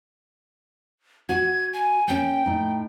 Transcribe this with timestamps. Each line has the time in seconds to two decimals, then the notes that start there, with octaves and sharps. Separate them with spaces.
1.29 F#4 G#6
1.73 G#5
2.08 A#3 C#4 G5
2.46 A2 D#4